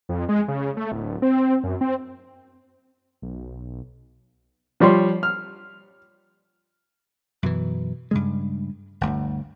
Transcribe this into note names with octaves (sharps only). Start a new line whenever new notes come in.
F2
G#3
C#3
A3
D1
C4
F#2
C4
B1
F3 G3 C#5 C6
F6
F#2 B2 E3
G2 C#3 G#3
G1 D2